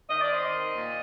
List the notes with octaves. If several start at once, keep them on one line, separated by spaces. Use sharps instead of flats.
D#3 D#5
D5
C4 D#5
D#3
A#2